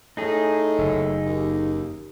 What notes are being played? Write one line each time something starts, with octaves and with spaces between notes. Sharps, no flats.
A2 D#4 G#4
F#1
D#2